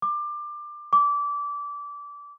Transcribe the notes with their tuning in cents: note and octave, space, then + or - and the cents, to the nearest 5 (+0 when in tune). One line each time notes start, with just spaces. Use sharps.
D6 +20
D6 -25